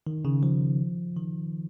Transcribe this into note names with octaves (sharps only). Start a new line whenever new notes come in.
D#3
C#3
F3
D#3